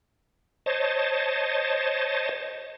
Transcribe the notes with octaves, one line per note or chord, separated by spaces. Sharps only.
C5 C#5 D#5 A5